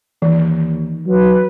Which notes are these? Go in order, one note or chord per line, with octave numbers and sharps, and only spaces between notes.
D#2 E3
F#3 B4